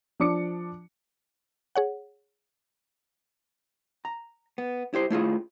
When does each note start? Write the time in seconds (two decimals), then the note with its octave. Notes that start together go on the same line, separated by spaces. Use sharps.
0.20 F3 D4 D6 C#7
1.76 G#4 C#5 F#5
4.05 A#5
4.58 B3
4.94 E4 G4 C5
5.10 A3 E4 F4 G#4